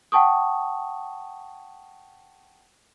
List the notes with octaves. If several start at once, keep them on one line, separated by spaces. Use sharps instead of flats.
F#5 G5 A5 C#6 D#6